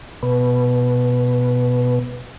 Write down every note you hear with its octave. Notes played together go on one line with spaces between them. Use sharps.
B2 B4